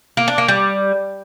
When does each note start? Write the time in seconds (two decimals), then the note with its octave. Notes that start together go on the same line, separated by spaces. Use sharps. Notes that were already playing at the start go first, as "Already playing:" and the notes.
0.17 A#3
0.28 D4
0.38 A#3
0.48 G3